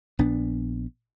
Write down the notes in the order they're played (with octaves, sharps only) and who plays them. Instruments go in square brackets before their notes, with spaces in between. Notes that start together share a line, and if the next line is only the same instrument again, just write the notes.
[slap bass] A#1 B3 D4